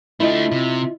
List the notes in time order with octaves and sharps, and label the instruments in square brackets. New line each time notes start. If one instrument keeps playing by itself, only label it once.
[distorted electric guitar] A3 D4 [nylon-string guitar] E4 F4 D#5
[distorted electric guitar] C3